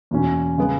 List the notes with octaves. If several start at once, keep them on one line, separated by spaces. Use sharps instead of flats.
E2 B2 A#3 C#4
C#3 G#3 B3